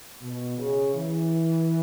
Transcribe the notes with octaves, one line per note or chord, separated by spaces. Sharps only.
B2
C#3
E3